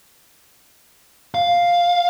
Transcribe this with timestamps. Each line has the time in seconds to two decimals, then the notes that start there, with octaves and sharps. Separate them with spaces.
1.35 F5